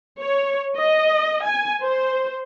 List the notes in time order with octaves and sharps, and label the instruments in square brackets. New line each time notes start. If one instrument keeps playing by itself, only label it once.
[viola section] C#5
D#5
G#5
C5